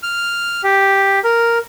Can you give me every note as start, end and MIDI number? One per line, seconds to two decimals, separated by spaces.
0.03 0.61 89
0.64 1.19 67
1.24 1.59 70